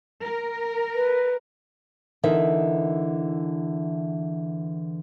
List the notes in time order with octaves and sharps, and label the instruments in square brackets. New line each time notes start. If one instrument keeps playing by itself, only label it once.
[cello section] A#4
[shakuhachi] B4
[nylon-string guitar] E2 D3 E3 D#4 A#4 E5